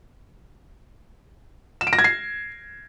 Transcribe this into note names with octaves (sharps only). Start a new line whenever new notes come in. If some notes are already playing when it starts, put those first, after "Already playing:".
E7
D7
A#6
G#6
C7